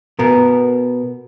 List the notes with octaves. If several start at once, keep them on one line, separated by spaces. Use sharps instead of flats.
B2 B3 A#4